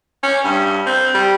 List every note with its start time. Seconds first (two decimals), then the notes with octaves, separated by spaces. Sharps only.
0.23 C#4
0.45 G2
0.87 C4
1.15 G3